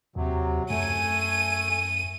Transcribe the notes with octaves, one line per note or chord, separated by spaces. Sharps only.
D#2 C3 F#3
F#2 A3 G#5 D#7